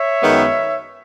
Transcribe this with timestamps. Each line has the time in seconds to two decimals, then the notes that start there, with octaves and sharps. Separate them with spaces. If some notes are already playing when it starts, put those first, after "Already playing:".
Already playing: C#5 E5
0.22 F#2 D#3 G#3 B3